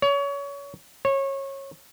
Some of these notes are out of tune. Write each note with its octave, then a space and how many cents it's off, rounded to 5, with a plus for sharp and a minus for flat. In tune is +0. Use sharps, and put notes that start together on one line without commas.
C#5 +25
C#5 -25